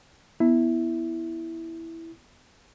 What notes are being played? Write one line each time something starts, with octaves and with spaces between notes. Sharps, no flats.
B3 E4